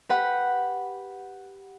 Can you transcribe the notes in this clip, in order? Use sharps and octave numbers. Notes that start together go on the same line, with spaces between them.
G4 B4 F#5 B5 F#6